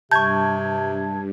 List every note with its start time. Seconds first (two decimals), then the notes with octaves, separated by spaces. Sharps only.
0.11 G2 C3 A5 C#6 G6 G#6